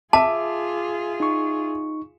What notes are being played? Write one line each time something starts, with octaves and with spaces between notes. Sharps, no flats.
F4 G#4 E5 A5 D6
D#4 C#6